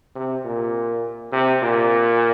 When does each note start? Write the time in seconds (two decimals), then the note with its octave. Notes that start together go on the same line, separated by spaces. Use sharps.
0.15 C3
0.45 A#2
1.32 C3
1.62 A#2